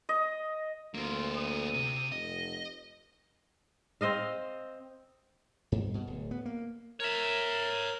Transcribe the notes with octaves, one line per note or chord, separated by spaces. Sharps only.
D#5
D2 A#3 C4 F4
D#6
C3
F1 D#5
C4 C5 D#5 F5
G2
B2
D1
B3
A#3
A#4 C#5 E5